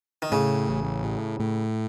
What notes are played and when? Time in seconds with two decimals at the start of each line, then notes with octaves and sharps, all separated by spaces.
0.22 D#3
0.32 A2 C#3
0.68 A1
1.03 A2
1.40 A2